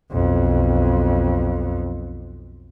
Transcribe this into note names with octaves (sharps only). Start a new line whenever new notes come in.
B1 F2